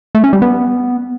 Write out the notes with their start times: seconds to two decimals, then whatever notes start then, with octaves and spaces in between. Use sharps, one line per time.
0.15 A3
0.24 C#4
0.33 G3
0.42 B3